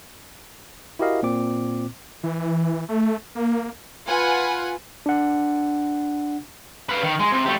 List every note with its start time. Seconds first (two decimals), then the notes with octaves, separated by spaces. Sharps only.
0.99 E4 F#4 G4 A#4 D#5 F5
1.23 A#2 C4 D6
2.23 E3
2.89 A3
3.35 A#3
4.08 F4 B4 F#5 G#5
5.06 D4 F#5
6.89 B4 F5
7.03 D#3
7.19 G#3
7.32 C3
7.46 A3 G4